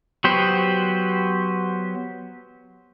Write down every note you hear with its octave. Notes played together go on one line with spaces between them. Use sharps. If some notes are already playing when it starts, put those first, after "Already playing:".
F#3 B3 G4 C5